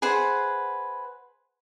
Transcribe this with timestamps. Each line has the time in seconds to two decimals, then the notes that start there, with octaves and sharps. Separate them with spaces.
0.02 G#4 B4 C5 F#5